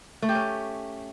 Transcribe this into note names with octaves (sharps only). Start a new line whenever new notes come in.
A3
G4
C#4